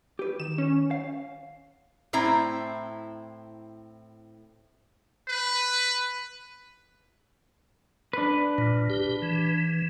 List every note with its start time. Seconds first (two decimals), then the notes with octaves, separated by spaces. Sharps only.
0.19 G4 B4
0.40 D#3 E7
0.58 C#4
0.91 F5
2.13 A2 C4 E4 A#5
5.28 B4
8.13 D4 B4
8.58 A#2
8.90 G4
9.22 E3